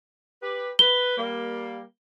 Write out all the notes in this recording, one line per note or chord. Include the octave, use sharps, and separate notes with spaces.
G4 B4
B4 G7
G3 A#3